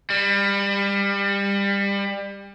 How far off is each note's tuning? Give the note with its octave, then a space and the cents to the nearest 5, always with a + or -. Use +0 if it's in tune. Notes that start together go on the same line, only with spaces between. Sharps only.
G3 +25